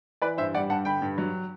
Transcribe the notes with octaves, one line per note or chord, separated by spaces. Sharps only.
E3 B4 D5
G2 C5 E5
G3 D5 F#5
G2 F#5 A5
D3 G5 B5
G2
F#3